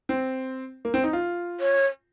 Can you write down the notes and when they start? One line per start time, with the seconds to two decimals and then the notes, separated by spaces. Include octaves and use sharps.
0.09 C4
0.85 A#3
0.94 C4
1.04 D#4
1.13 F4
1.60 C#5